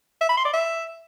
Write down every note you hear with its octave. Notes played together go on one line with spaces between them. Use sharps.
E5
B5
C6
D5
E5